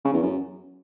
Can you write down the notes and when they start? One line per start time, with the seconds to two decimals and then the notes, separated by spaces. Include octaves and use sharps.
0.05 C#3
0.14 E2
0.23 F#2